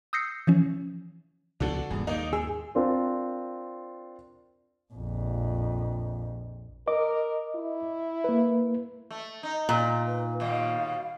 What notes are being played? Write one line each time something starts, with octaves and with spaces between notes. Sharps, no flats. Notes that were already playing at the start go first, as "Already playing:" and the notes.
D#6 E6 G6 A#6 C7 C#7
E3 F3 C#4
C#2 B2 F3 D4 F#4 A4
D#1 G2 G#4
D#2 G#2 D#3 A#3 D#4 D#5
G#4 E6
C4 D4 F4 A#4 C5
A#1 F2
A#4 D#5 D6
E4
A#3 B4
A3
D#4 A#5
A#2
B4
D#2 B2 G3 F5